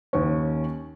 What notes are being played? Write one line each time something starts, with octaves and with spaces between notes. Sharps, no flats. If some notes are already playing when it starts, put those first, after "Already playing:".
D#2 C#4